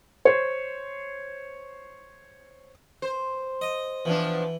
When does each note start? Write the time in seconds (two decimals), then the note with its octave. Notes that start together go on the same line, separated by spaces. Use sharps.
0.25 C5 C#5
3.02 C5
3.61 D#5
4.05 B2 E3 F3 D4